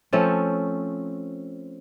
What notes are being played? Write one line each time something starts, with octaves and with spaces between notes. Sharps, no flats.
F3 A3 C4 C#4